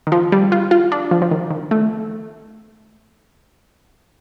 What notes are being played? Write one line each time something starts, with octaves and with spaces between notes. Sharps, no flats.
D#3
F3
G3
F4
F4
D4
F3
F3
D#3
D#3
A3